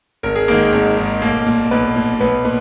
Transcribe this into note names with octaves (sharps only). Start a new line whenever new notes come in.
G#1 A#4
G#4
G#2 D#3 A#3 A#4
G#1
G#2 D#3
B1 A#3 A#4
A#2
B1 B3 B4
A#2
B1 B3 B4
A#2 B4